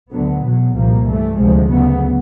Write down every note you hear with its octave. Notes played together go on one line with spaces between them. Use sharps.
D2 D3 F#3 B3
E2 B2 F#3
C2 A#2 F3 A#3
G2 E3 A3
D2 C3 F3 G#3
D2 C#3 F#3 B3